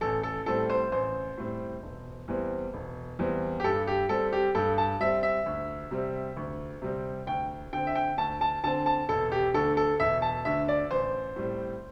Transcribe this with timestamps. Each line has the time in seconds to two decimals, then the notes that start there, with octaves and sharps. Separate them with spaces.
0.01 A1 A4
0.23 A4
0.46 A2 G3 C4 A4
0.70 C5
0.92 A1 C5
1.37 A2 G3 C4
1.83 E1
2.28 E2 E3 G3 C4
2.74 E1
3.19 E2 E3 G3 C4
3.60 G4
3.64 G2 A4
3.87 G4
4.09 G3 C4 A4
4.33 G4
4.55 G2 A4
4.78 A5
5.00 G3 C4 E5
5.23 E5
5.46 D2
5.91 C3 G3 C4
6.37 D2
6.82 C3 G3 C4
7.27 D2 G5
7.73 D3 C4 G5
7.87 E5
7.95 G5
8.18 D2 A5
8.41 A5
8.64 D3 C4 A5
8.86 A5
9.09 E1 A4
9.32 G4
9.54 D2 D3 A4
9.77 A4
10.00 E1 E5
10.22 A5
10.45 D2 D3 E5
10.68 D5
10.90 A1 C5
11.36 A2 G3 C4